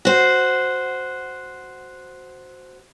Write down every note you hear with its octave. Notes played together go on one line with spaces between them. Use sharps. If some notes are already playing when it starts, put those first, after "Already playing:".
F#4 C5